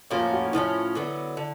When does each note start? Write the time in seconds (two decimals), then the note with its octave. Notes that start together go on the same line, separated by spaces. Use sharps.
0.11 A2 F3 A#3 C#4 F4
0.32 F#4
0.53 A2 F3 A#3 C#4 E4
0.95 D3 F#3 B3
1.37 D3